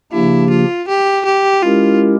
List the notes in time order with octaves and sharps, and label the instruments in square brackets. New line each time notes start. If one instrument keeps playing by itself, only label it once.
[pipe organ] C#3 F3 A#3 D4 G4 [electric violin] E4
[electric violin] F4
G4
G4
[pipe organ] G#3 C#4 E4 G4 A#4 [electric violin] F4